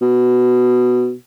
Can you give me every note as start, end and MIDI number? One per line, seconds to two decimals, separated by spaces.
0.01 1.13 47